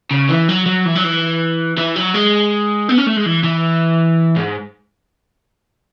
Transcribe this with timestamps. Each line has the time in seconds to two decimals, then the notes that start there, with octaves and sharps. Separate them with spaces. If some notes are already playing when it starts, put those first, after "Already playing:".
0.11 C#3
0.29 E3
0.49 F#3
0.66 F#3
0.86 E3
0.96 F#3
1.04 E3
1.77 E3
1.96 F#3
2.15 G#3
2.89 B3
2.98 C#4
3.07 A3
3.17 G#3
3.26 E3
3.44 E3
4.36 G#2